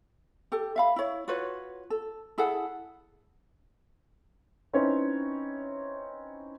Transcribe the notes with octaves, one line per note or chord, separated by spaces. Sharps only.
G4 A4
E5 F5 B5
E4 C#5
F4 F#4 B4 C#5
A4
E4 G#4 A4 F#5
C4 C#4 D#4 E4 B4 C#5